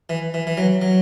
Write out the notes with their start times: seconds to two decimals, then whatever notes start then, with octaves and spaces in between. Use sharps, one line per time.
0.09 E3
0.34 E3
0.47 E3
0.57 F#3
0.82 F#3